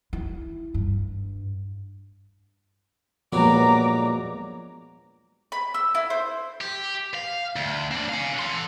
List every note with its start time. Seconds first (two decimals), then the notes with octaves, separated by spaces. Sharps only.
0.13 E4
0.74 G2
3.32 G2 A#2 F3 F#3 G#3 B3 A#5 D6
5.52 B5
5.74 E6
5.95 E4
6.10 C5
6.61 G4
7.15 F5
7.56 D2
7.91 C4 D4
8.09 F5 G#5
8.39 A4 C6